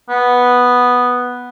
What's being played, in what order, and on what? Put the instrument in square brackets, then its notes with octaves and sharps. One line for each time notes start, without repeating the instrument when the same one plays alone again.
[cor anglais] B3